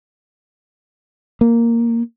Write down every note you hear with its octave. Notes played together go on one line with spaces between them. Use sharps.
A#3